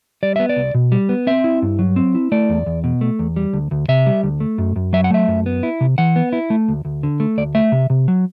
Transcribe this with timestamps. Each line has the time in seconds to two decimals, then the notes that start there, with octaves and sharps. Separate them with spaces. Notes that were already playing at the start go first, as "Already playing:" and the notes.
0.23 G3 D5
0.36 B3 E5
0.49 D5
0.56 C2
0.74 B2
0.92 G3
1.09 B3
1.27 C4 E5
1.44 E4
1.62 G2
1.79 F#3
1.96 C4
2.15 E4
2.32 A3 D5
2.49 E2
2.66 E2
2.84 B2
3.01 A3
3.19 E2
3.36 G3
3.53 D2
3.71 D2
3.88 C3 E5
4.06 G3
4.23 D2
4.40 A3
4.58 F#2
4.76 F#2
4.93 F#3 E5
5.04 F#5
5.10 A3 E5
5.28 F#2
5.46 B3
5.63 E4
5.81 C3
5.98 E3 F#5
6.16 B3
6.33 E4
6.50 A3
6.68 D2
6.85 D2
7.03 D3
7.20 A3
7.38 D2 D5
7.55 A3 E5
7.72 C3
7.90 C3
8.08 F#3